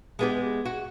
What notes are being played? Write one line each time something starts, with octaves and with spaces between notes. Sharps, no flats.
G#3 B3 G4
F#4